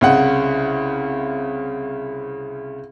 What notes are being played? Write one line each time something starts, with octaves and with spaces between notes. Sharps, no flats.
C2 C#3 F#5